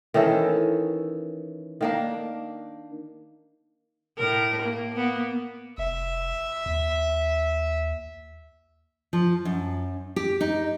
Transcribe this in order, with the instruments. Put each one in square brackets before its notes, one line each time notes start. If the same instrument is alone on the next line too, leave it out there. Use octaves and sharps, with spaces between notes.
[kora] D#3 E3 C#4 A4
D#3 A#3 D4
[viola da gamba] A2 A#4
A#3
A#3 B3
[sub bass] F1 [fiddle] E5
[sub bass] D#2
[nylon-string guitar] F3
F#2
G4
D#4